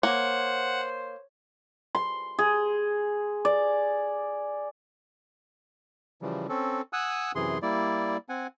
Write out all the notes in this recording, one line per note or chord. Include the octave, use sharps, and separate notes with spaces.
A#3 C5 C#5 F#5
C6
G#4
D5
C#3 E3 F3 G3
C4 C#4 A4
F#5 G#5 D#6 E6 F#6
F#2 C3 E3 G#4 C6
G3 A#3 E4 D5
C4 F#5 G#5